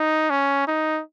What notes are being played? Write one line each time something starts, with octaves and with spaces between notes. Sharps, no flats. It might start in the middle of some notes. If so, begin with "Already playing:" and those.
Already playing: D#4
C#4
D#4